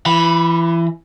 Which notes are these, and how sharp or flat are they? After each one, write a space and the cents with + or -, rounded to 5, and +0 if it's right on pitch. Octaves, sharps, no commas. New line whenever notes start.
E3 +25 B5 -10